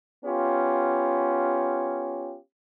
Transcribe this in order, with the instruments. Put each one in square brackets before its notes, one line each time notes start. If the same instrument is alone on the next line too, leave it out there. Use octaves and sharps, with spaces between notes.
[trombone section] B3 C#4 F4 G4